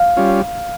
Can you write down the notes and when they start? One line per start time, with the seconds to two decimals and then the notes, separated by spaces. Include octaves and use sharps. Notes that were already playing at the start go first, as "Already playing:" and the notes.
Already playing: F5
0.17 G3 C#4 F4